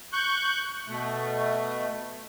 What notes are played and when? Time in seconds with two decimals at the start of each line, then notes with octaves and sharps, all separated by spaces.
0.13 C#6 F#6 G6
0.87 B2 A3